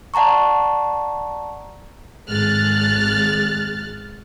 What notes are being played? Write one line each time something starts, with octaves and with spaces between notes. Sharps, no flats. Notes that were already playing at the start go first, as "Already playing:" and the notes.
D5 F#5 A5 A#5 C#6
G#1 G#3 F6 F#6 A6